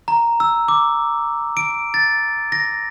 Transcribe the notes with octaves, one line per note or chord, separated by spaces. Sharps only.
A#5
E6
D6
D7
A6
A#6